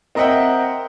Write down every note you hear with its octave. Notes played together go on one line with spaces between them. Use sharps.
C4 A#4 D#5 E5 F#5 G5